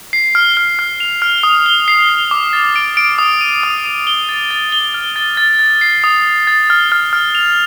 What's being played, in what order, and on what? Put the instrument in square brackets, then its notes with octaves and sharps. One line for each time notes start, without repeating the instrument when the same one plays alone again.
[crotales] C7
F6
F6
F6
F7
F6
D#6
G7
C7
C7
D6
A6
D7
D7
D#6
D#7
D#6
D#7
G7
A6
A6
G7
F6
A6
A6
A6
C7
D#6
D#6
A6
F6
F6
F6
F7